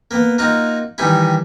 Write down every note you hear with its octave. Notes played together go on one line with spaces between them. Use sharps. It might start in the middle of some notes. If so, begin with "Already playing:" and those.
A#3 B3
A#3 D#4 F4 F#4
D#3 E3 G3 D#4 E4